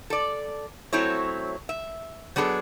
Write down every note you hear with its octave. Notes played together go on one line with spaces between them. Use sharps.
A4 D5
F#3 A3 C4 E4 C#5
E5
F#3 B3 D4 G#4 A4